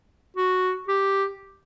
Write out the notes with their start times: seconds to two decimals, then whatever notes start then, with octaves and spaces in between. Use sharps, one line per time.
0.36 F#4
0.88 G4